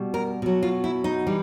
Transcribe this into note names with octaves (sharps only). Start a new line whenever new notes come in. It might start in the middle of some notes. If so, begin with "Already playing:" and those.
Already playing: B2 G3
A#4
B2 F#3
F4
E4
D#4
E3 G3